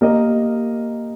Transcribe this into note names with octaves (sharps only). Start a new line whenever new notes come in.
A#3 G4 A#4 D#5